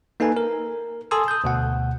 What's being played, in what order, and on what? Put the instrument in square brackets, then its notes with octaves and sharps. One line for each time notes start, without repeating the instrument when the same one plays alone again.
[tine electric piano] A#3 D#4 A4 B4 G#5
A#4
A4 G#5 A5 C6 D#6 E6
D#6 G6
D2 B2 F#5